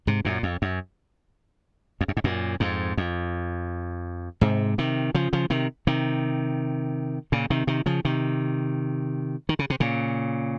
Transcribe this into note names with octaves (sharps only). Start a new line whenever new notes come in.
G#2 C3
F#2 A#2
F2
F#2
F2
F#2
G#2
F#2 A#2
F2 G#2
F2
G#2 C3
C3 D#3
C#3 F3
C#3 F3
C3 D#3
C3 D#3
A#2 C#3
C3 D#3
C3 D#3
C#3 F3
C3 D#3
D#3
C#3
C3
A#2 C#3